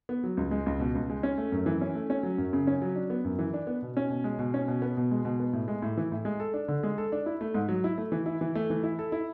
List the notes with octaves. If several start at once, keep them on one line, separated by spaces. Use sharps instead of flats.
B3
F#3
C#2
G#3
C#2
B2
C#2
G#3
C#4
A3
F#2
E3
C#4
A3
C#4
F#3
F#2
C#3
C#4
F#3
D4
B3
F#2
E3
D4
B3
B2
C#4
B2
G#3
B2
C#4
B2
B3
B2
G#3
B2
B3
A2
G#3
A2
E3
A2
G#3
A4
D4
D3
G#3
A4
D4
E4
A3
G#2
F#3
E4
A3
E3
E4
E3
A3
E3
E4
A4
E4